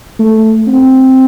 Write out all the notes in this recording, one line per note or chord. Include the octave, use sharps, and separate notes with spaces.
A3
C4